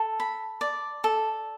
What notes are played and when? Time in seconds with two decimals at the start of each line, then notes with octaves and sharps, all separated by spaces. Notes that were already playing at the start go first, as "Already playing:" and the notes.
Already playing: A4 A5
0.20 B5
0.61 D5
1.04 A4